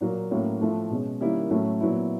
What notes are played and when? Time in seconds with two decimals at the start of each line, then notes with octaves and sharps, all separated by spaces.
0.01 A#2 F#3 A#3
0.31 A2 F#3 A#3 C#4
0.61 A2 F3 A3
0.90 B2 G#3 C#4
1.21 D#3 G3 A#3 C#4 E4
1.51 A2 F#3 A3 C#4
1.80 A#2 F#3 B3 E4